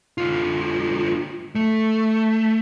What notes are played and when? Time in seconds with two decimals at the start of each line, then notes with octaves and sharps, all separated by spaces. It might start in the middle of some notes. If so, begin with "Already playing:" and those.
0.18 D3 F4
1.55 A3